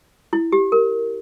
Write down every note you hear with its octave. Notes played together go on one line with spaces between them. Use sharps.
E4
G4
A#4